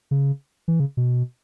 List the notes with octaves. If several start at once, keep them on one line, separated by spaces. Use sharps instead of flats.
C#3
E3
C#3
B2